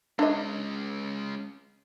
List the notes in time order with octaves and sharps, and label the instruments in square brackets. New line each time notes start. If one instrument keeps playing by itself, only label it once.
[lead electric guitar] G#3 C#4 [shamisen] D4 D#5